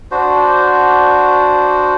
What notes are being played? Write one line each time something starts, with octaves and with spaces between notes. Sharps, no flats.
D4 F#4 C5